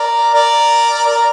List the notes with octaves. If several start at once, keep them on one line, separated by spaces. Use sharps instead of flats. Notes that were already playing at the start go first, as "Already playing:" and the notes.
Already playing: A#4 D5
A#4 D5
A#4 D5